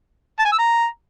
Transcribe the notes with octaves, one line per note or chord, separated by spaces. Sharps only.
A5
G#5
E6
A#5